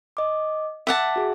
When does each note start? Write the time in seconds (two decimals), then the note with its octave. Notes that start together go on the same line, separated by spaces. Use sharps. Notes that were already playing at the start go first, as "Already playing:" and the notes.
0.17 D#5 D6
0.87 E5 F#5 A5 D6 B6
1.16 F#4 G#4